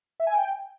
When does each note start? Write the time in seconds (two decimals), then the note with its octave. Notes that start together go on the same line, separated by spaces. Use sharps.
0.20 E5
0.27 G#5
0.34 G5